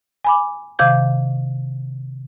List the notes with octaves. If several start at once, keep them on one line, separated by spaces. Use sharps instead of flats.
G#5 B5 D6
C3 D#3 F5 D6 G6 G#6